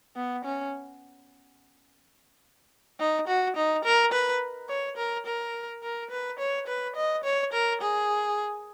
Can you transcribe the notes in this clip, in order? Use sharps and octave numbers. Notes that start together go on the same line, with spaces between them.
B3
C#4
D#4
F#4
D#4
A#4
B4
C#5
A#4
A#4
A#4
B4
C#5
B4
D#5
C#5
A#4
G#4